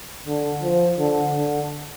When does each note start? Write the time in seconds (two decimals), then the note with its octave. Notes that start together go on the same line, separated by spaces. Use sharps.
0.27 D3
0.62 F3
0.99 D3
1.34 D3